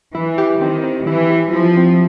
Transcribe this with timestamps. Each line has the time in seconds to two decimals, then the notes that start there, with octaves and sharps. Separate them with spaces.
0.15 E3 E4
0.38 G4
0.61 D#3 C4
0.84 C4
1.07 E3 E4
1.30 G4
1.53 F3 E4
1.77 C4